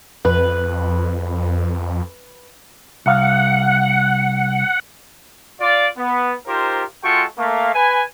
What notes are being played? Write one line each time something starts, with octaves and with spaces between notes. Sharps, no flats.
F2 B4
C2 F5 F#5
F4 D5
B3
D#4 F4 G4 A#4 C5
G#3 F4 F#4 A4 G5 C#6
A3 A#3 F5
B4 G#5